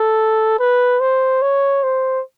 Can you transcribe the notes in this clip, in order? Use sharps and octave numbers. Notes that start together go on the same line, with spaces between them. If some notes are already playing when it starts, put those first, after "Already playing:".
Already playing: A4
B4
C5
C#5
C5